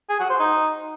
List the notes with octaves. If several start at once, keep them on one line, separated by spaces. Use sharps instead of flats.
G#4
F#4
C5
D#4